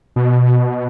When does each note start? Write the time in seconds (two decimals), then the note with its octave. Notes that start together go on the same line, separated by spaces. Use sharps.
0.16 B2